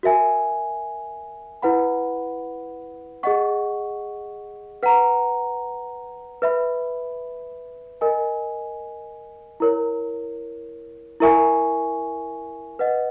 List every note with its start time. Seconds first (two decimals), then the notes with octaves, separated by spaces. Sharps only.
0.03 F#4 A#4 E5 G#5
1.62 E4 B4 F#5 B5
3.23 G#4 D#5 F#5 C#6
4.83 B4 F#5 A#5
6.42 B4 E5 B5
8.01 A#4 D#5 G#5
9.60 E4 A#4 C#5
11.20 E4 A#4 E5 G#5 C#6
12.79 B4 D#5 F#5